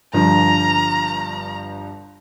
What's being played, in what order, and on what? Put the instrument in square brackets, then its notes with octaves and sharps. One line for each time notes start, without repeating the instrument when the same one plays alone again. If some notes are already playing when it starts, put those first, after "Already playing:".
[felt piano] G1 G2 F3 [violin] A#5